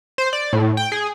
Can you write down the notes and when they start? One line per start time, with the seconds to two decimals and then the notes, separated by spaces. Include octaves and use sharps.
0.18 C5
0.33 D5
0.53 A2
0.77 G5
0.92 G#4